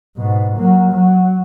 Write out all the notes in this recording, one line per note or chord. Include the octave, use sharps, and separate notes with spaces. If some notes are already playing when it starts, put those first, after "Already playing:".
G#2 B2
F#3 A#3
F#3